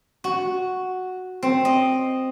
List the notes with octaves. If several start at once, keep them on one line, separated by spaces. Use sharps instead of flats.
F#4
C4
D#5